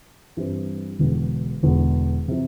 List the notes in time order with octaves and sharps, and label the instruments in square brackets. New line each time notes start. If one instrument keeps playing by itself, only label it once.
[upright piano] G2 E3 G3 C4
E1 E2 D3
E1 E2 D3
C3 E3